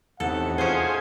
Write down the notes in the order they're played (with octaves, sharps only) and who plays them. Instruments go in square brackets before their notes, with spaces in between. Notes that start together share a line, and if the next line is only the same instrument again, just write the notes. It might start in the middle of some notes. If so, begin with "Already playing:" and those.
[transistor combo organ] E2 [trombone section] A2 C3 D#4 [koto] A4 [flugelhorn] F#5
[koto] C#4 C5 [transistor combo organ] F4 G#4 G#5